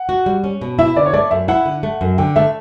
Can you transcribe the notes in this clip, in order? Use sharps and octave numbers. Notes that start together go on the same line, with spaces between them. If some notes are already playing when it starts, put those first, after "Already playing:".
Already playing: F#5
F#4
G3
C#4
B2
E4 E5
D3 D5
C#5
A3 D5
F#2 E5
E4 F#5
D3
A3
F#2
D3 G5
A3 E5